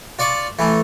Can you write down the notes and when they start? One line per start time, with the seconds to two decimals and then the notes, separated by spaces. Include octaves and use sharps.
0.19 F4 D5 C#6
0.59 E3 A3